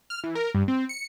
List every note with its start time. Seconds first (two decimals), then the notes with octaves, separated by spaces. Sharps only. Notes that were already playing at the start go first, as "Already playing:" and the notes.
0.10 F6
0.24 E3
0.35 A#4
0.55 G2
0.68 C4
0.89 C#7